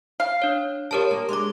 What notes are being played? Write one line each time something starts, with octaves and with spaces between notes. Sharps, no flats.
F5
D4 C#5
G3 F4 G4 A#4 C#5 A5
A#3
G#3 D4 C6 D6